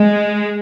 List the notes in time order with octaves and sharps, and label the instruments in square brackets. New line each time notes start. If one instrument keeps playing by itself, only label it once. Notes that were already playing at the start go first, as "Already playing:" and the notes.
Already playing: [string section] G#3